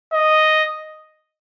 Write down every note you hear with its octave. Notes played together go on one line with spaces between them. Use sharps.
D#5